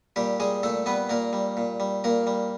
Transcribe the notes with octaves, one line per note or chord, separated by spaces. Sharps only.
A#2 G3 G4
G3 G#3 G#4
A#2 A3 A4
G3 B3 B4
A#2 A#3 A#4
G3
A#2
G3
A#2 A#3 A#4
G3